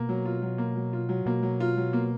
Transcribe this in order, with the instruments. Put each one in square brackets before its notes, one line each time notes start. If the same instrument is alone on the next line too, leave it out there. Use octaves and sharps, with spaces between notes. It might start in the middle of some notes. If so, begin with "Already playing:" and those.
Already playing: [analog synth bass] B2 [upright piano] A#3
[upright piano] F#3
F4
F#3
A#3
F#3
F4
F#3
[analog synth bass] B2 [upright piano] A#3
[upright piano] F#3
F4
F#3
A#3